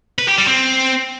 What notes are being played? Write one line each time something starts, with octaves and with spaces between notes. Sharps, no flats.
B4
G4
G3
C4